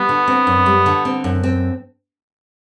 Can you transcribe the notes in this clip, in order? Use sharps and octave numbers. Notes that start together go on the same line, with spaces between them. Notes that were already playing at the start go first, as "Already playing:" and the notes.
Already playing: G3 B3
D3
C4
F#2
G3
D3
C4
F#2
C4